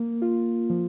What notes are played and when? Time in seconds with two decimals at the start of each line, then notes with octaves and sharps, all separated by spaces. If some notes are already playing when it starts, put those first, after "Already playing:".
Already playing: A#3
0.22 F4
0.70 F3